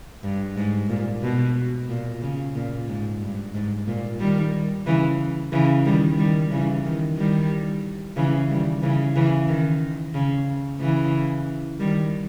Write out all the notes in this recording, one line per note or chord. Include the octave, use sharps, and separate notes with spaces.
G2
G#2
A#2
B2
A#2
C#3
A#2
G#2
G2
G#2
A#2
D#3 G3
C#3 E3
C#3 E3
D#3 G3
D#3 G3
C#3 E3
D#3
D#3 G3
C#3 E3
D#3 G3
C#3 E3
C#3 E3
D#3
C#3
C#3 E3
D#3 G3